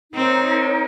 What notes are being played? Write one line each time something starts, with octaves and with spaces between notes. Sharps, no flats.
C4 D#4 A#4 C#5